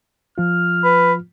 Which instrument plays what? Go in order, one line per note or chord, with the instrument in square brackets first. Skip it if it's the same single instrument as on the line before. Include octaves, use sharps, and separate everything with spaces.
[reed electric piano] F3 F4 [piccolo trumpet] F6
[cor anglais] B4